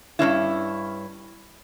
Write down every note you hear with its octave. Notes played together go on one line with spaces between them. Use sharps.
G2 C3 C#4 E4